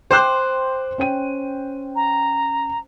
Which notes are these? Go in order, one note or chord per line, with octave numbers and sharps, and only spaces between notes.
C5 G5 D6 F#6
C#4 G5 D#7
A#5